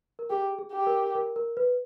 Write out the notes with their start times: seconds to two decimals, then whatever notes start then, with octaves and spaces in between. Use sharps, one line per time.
0.19 A#4
0.30 G4 G#4
0.59 G#4
0.72 G4
0.87 A#4
1.15 A#4
1.36 A#4
1.57 B4